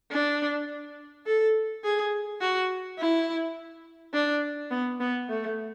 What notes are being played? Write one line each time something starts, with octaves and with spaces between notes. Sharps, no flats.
D4
A4
G#4
F#4
E4
D4
B3
B3
A3